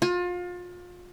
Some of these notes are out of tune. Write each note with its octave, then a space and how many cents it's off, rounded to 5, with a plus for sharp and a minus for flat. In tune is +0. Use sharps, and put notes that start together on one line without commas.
F4 +30